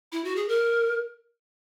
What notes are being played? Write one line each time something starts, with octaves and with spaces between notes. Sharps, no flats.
E4
F#4
G#4
A#4